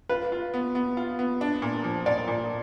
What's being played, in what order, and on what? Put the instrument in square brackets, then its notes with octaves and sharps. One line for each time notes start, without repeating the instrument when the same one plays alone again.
[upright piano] F4 [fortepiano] B4
[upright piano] F4
B3
B3
F4
B3
D4
A#2
F3
[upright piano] A#2 [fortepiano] D5
[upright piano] A#2